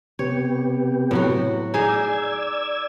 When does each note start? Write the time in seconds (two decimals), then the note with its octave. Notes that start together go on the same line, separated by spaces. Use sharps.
0.19 C3 B3 G4 C#5
1.11 A2 F#3 F#4
1.74 D#4 G#4 D5 E6 G#6